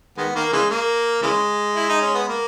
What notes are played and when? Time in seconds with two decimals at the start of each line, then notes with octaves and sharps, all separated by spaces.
0.18 D#3 G#3 B3
0.35 D#3 A#3
0.53 C#3 E3 G#3
0.70 A#3
1.22 C#3 E3 G#3
1.76 E4
1.89 D#4
2.01 C#4
2.14 B3
2.29 A#3